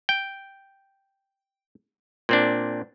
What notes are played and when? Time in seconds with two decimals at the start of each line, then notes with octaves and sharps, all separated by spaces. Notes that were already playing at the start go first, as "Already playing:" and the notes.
0.09 G5
2.29 A#2 C4 D4